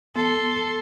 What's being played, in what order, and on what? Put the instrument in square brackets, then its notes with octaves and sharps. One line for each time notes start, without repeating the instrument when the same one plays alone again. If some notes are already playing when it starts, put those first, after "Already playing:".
[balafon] B3 [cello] A4 [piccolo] C6